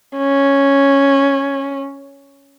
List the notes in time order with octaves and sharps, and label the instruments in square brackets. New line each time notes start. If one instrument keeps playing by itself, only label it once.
[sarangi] C#4